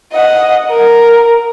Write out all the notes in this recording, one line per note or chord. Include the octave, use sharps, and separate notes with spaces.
D#5 F#5
A#4